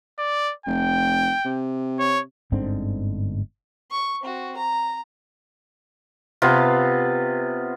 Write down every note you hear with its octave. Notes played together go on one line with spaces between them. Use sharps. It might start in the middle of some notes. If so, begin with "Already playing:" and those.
D5
F1 G5
C3
C#5
G1 G#2 D3 C4
C#6
C4 F#4
A#5
C3 B3 F4